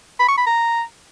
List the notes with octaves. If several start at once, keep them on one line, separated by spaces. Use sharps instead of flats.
B5
C#6
B5
A#5